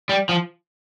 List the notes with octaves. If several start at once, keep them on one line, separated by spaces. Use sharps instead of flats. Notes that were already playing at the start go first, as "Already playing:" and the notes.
G3
F3